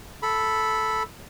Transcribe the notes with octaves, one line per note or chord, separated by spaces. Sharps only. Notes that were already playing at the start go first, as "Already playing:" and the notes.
A4 B5